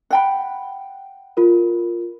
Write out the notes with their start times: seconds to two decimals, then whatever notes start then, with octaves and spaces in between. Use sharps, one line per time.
0.10 F#5 G5 B5
1.37 F4 A#4